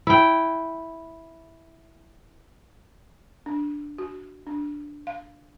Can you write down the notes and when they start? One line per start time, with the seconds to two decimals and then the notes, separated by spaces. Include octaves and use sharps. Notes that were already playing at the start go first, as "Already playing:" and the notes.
0.07 E4 G5
3.46 D4
3.98 F#4
4.47 D4
5.07 F5